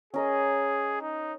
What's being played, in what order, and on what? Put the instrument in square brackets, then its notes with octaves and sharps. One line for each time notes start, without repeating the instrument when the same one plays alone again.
[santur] C#4 A#4 D#5 [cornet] G#4
[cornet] D#4